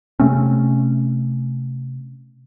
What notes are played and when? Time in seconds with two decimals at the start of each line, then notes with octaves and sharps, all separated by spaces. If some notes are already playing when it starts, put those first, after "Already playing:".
0.20 C3 A3 C4 C#4